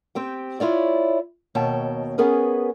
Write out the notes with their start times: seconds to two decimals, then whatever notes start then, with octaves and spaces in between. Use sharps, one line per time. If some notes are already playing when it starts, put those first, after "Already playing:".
0.15 C4 G4 G5
0.60 E4 F4 C#5 D5
1.55 D#2 B2 C#5 G5 A5
2.18 B3 C#4 G#4 A#4 B4